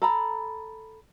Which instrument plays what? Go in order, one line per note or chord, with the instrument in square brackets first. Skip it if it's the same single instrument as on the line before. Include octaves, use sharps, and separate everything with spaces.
[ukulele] A4 A#5 B5